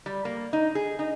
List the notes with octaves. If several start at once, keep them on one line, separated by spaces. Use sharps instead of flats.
G3
A#3
D#4
G#4
D#4